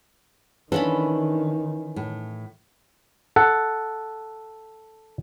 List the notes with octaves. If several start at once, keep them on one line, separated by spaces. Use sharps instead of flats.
D#3 E3 C#4 D4 F4 A4 B5
A2
A4 F#5